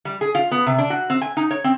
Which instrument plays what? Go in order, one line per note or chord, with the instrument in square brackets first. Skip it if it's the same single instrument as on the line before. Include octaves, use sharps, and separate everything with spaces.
[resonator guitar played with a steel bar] G3
G#4
F4
B3
C3
D4
F#4
C4
G#5
D#4
C#5
C4